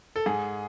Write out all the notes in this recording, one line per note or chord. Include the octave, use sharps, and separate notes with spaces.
A4
G#2 G#4